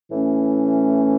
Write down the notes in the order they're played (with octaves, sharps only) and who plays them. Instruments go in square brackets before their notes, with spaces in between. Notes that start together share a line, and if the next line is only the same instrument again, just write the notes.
[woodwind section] A2 E3 A3 C#4